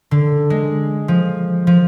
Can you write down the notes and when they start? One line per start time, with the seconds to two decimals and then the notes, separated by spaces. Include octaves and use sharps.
0.11 D3
0.50 G#3
1.08 F3
1.67 F3